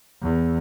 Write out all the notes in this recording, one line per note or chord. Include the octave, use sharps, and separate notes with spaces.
E2